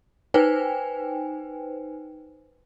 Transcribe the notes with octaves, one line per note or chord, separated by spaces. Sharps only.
D#4 B4 C5 G5 G#5